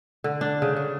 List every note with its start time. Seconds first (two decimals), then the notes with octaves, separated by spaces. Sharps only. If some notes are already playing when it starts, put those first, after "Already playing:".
0.24 D3
0.41 D4
0.62 C#3
0.76 C#3